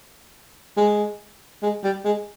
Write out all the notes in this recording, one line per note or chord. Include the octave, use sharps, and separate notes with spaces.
G#3
G#3
G3
G#3